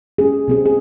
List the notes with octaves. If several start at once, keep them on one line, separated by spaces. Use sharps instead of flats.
C#4 G#4
C3 C4 G#4
G#4